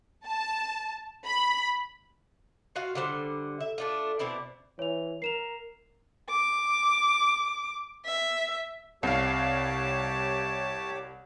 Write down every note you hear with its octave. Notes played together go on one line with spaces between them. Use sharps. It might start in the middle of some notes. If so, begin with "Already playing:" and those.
A5
B5
F4 F#4 F5
D3 G3 C5
E5
A3 D4 F4
B2 C4 E4 D5
E3 C#5 F7
A#4 C7 E7 F7
D6
E5
C2 C3 G4 C#5 F5 A5 D6